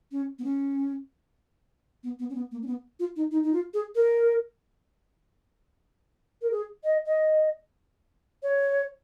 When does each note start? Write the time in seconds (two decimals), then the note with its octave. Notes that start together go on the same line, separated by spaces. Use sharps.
0.12 C#4
0.39 B3
0.44 C#4
2.03 B3
2.19 B3
2.30 C#4
2.35 B3
2.51 A#3
2.62 C#4
2.67 B3
3.00 F4
3.16 D#4
3.31 D#4
3.43 D#4
3.53 F4
3.74 G#4
3.95 A#4
6.42 A#4
6.51 G#4
6.84 D#5
7.06 D#5
8.43 C#5